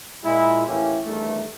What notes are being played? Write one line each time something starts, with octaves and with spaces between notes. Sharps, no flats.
A#2 G#3 E4
D#2 A2 E3 A#3 C#4 G4
E2 G2 D#3 A3